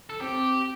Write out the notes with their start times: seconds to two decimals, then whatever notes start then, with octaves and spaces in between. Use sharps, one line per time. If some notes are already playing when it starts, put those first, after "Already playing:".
0.10 A4
0.20 C4 G4